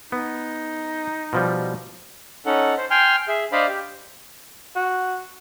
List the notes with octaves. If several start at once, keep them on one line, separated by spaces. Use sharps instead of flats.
B3 D#4
B2 F3 G3
C#4 D#4 A4 F#5
C5
G5 G#5 C6 F6
G#4 E5
D4 C5 D5 D#5 F5 B5
G4
F#4